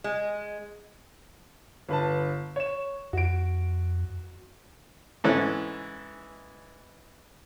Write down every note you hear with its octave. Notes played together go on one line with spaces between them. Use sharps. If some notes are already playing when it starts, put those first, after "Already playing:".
G#3
G1 B4 A5
C#5 E7
F2 F#4 D7
G#2 E3 C#4 A4 F#6